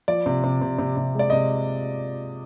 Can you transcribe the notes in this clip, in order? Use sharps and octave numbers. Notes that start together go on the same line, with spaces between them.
F3 D5
C3
C3
C3
C3
C3
G#3 D5
C3 D#5